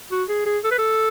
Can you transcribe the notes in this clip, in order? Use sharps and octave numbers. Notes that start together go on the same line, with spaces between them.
F#4
G#4
G#4
A4
B4
A4